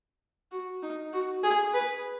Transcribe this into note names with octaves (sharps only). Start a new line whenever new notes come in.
F#4
D#4
F#4
G#4
B4